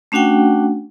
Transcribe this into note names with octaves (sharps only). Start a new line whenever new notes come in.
A3 C#4 D4 F#4 F#5 G5